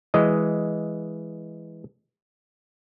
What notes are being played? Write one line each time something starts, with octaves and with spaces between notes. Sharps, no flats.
E3 G#3 D#5